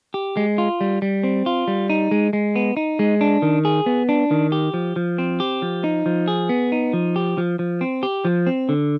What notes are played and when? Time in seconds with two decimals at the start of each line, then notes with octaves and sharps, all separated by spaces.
0.14 G4
0.37 G#3
0.58 F4
0.81 G3
1.02 G3
1.24 C4
1.46 F4
1.68 G3
1.90 D#4
2.11 G#3
2.33 G#3
2.56 B3
2.77 D#4
2.99 G#3
3.21 D4
3.42 D#3
3.65 G#4
3.86 B3
4.09 D4
4.31 D#3
4.52 G4
4.74 F3
4.96 F3
5.18 C4
5.40 G4
5.62 F3
5.84 D#4
6.06 F3
6.28 G#4
6.49 B3
6.72 D#4
6.93 F3
7.16 G4
7.38 F3
7.59 F3
7.81 C4
8.03 G4
8.25 F3
8.47 C4
8.69 D3